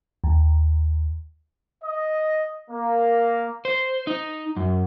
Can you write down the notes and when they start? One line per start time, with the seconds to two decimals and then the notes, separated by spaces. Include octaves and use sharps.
0.24 D#2
1.84 D#5
2.69 A#3
3.65 C5
4.07 D#4
4.57 F#2